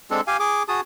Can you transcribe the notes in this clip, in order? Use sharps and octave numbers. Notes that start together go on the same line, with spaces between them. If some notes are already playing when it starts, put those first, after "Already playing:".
G#3 C4 D4 A4
G4 F5 G#5
G#4 D6
F#4 G#4 A5 D#6